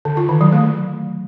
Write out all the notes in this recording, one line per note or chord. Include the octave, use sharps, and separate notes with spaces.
D3
F4
D#3
F#3
A3